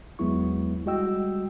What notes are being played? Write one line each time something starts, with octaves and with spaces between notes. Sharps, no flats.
E2 F#3 G#3 B3 E4 C#6
G3 G#3 F#4 D#5 G5 E6